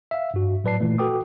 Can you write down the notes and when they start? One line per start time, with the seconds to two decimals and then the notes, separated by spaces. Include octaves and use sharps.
0.11 E5 F5
0.34 G2 F#4
0.64 A2 F#3 B4 D5 A5 C7
0.80 A#2 E3 A3
0.98 F#4 A4 B4 G5 D6 D#6